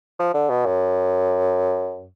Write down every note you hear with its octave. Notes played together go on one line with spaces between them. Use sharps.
F3
D3
B2
F#2